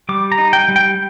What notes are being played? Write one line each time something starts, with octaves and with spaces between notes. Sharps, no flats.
G3 D6
A#5
D#4
G5
G3
G5